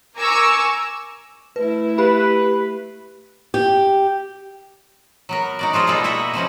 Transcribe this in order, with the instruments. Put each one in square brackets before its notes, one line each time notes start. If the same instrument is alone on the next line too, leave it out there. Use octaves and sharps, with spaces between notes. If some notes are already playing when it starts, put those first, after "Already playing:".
[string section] A#4 G#5 A#5 C#6 D6 E6
[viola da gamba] A3 E4 [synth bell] B4
[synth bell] G4 B5 [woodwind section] B4
[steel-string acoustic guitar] G4
[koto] F#3 B3 A#4
D#4 F#4 D5
F3 F4 G#4 A4 D#5
B2 G3 G#3 A#3 A4
E4 F#4 D#5 E5
B2 F3 G3 C#4